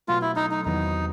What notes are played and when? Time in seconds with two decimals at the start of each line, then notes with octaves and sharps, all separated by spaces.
0.08 B2 F#3 A3 F4
0.22 E4
0.36 D#4
0.51 D#4
0.65 E2 C3 D#3 F#3 B3 D#4